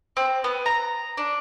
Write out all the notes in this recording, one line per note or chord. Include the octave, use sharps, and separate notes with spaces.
C4
B3
A#5
D4